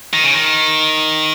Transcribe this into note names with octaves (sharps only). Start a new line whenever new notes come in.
D#3
C#3
D#3